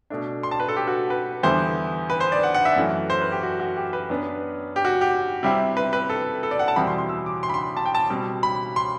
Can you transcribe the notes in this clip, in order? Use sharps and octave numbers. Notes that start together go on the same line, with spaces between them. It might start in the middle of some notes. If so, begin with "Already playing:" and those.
B2 A3 D4
C6
A5
B4
A4
G4
F#4
B4
E2 D3 G3 B3 E4 C5
B4
C5
D5
F#5
F#5
E5
F#2 E3 A3
C5
B4
G4
F#4
F#4
G4
B4
F#2 F#3 B3 D4
G4
F#4
G4
C3 G3 C4 E4
B4
B4
A4
A4
D5
F#5
A5
E2 B2 G3 C4 E4 B5
C6
C6
E6
D6
C6
B5
C6
A5
G5
A5
B2 G3 C4
B5
C6